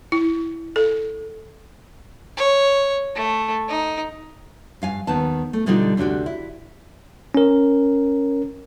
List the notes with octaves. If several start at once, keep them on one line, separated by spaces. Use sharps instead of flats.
E4
A4
C#5
A3
D#4
G2 F5 G#5
D#2 D#3 B3 A5
A3
B2 D3 G3 D4 D#4 F4
D2 C3 D4 F#4 G4
E4
C#4 A#4